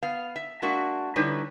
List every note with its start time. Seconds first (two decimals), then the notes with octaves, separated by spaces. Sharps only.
0.03 B3 F5
0.36 E5
0.62 G#3 A#3 D4 F#4 E5
1.16 D3 G3 D#4 E4 B4 C#5